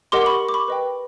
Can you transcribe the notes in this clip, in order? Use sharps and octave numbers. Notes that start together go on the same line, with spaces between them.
G4 A#4 D#5 F#5 C6 D6
B5 C#6
D6
B5 C#6
B4 D#5 G5